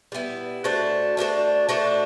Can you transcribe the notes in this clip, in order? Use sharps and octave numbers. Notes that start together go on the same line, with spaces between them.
G3 B3 E4
A3 D4 F#4 C5
A3 D4 F#4 C5
A3 D4 F#4 C5